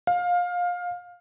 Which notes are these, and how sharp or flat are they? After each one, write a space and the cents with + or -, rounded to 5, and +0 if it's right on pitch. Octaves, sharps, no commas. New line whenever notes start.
F5 +20